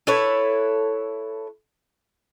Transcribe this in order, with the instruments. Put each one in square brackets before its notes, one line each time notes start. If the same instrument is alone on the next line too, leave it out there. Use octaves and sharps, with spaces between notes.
[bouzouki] E4 A4 B4 C#5